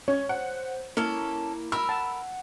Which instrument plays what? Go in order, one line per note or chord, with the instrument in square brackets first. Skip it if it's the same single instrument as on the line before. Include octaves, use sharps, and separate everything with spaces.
[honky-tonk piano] C#4 [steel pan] C#5
[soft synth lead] C5 [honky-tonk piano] F#5
[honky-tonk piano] A#3 [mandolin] C#4 A4 [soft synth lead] E4
[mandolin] A#4 B5 [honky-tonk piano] E6
[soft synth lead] F#5 [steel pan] A5